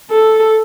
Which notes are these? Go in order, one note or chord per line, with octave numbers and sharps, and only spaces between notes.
A4